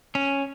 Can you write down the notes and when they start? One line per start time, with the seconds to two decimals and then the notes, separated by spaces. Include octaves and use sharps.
0.15 C#4